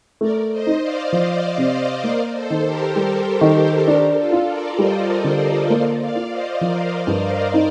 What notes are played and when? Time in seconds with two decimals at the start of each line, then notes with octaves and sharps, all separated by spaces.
0.21 A3 A#4 D5
0.51 C5 D#5
0.67 D#4
0.82 D5 F5
1.12 F3 C5 D#5
1.43 D5 F5
1.58 C3
1.73 C5 D#5
2.03 A#3 A#4 D5
2.34 A4 C5
2.50 D#3
2.65 G4 A#4
2.96 G3 A4 C5
3.25 G4 A#4
3.41 D#3
3.56 A4 C5
3.87 D4 G4 A#4
4.17 F4 A4
4.33 F4
4.47 A#4 D5
4.78 G3 C5 D#5
5.24 D3
5.69 A#3 D5 F5
6.00 D5 F5
6.16 F4
6.30 C5 D#5
6.61 F3 A#4 D5
6.91 A#4 D5
7.07 G2
7.22 A#4 D5
7.54 D#4